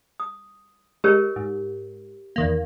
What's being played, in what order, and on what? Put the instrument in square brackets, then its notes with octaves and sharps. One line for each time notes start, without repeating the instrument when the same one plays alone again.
[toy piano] D#6
[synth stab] G#3 [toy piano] G4 A#4 C#5
[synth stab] G#2
E2 D#3 A#3